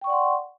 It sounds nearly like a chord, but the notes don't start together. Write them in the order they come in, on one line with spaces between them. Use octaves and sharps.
G5 C#6 D5 F#5 C6